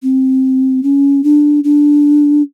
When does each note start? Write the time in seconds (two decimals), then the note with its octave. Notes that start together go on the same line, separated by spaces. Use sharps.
0.03 C4
0.83 C#4
1.24 D4
1.64 D4